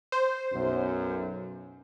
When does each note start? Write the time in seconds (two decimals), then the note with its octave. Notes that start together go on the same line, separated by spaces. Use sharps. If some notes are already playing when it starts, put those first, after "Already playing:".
0.12 C5
0.53 B1 F#2